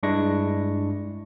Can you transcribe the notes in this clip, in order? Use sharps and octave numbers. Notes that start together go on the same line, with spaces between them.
G2 G#3 D4 E4 C#6 A#6